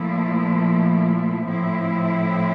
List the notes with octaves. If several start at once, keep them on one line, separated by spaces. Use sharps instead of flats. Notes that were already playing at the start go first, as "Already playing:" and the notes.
Already playing: A#2 F3 A3 E4
A2 F3 C4 E4